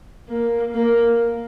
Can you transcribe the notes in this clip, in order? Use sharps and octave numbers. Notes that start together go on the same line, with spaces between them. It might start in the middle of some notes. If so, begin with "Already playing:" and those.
A#3
A#3